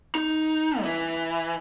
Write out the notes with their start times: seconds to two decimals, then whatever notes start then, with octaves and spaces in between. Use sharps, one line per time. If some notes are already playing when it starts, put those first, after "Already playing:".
0.15 D#4
0.80 F#3
0.85 E3